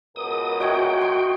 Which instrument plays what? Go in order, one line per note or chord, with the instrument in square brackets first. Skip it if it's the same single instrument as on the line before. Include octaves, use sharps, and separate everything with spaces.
[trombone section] C#2 B2 A#4 [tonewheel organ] D#6
[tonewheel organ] F#4 G5 [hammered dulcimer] D#5 E5 G#5
[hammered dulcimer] C6